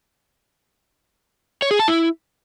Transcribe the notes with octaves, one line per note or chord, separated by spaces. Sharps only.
C#5
G#4
A5
E4